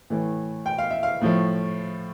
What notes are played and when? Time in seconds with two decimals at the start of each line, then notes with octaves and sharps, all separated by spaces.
0.10 A2 E3 A3
0.66 G5
0.78 F5
0.91 E5
1.03 F5
1.21 A2 F3 A3